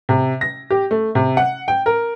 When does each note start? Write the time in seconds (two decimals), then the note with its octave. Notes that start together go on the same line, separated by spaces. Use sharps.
0.09 C3
0.41 A#6
0.70 G4
0.91 A3
1.15 C3
1.37 F#5
1.68 G5
1.86 A#4